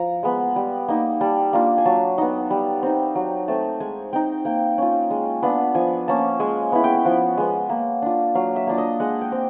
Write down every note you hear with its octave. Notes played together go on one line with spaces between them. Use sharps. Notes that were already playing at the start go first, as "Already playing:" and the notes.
Already playing: F3 A#5
G#3 B3
G3
A#3 D#4
G3 A5
A#3 D4 F4
G#5
F#3 A5
B3 D#4
G3
C4 D#4
F#3
A3 C4 A5
G#3 G#5
C4 D#4 G5
A#3 G5
C#4 F4
G#3
B3 D4 F4
F3 G#5
A#3 C#4 A5
G#3 G#5
B3 E4
G5
G5
F3 F#5
G#3 B3
A#3
D4 F4
F#3 F5
E5
A#3 D4 F4
D#5
G#3 F#5
G5
C4